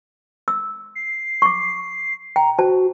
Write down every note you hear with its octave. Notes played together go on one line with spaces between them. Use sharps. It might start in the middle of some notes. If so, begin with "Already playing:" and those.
E6
C7
C#6 D6
G5 A#5
F#4 C5 A5